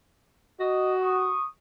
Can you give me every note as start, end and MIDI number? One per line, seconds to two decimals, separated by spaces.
0.60 1.34 66
0.60 0.93 75
1.02 1.44 85
1.02 1.44 87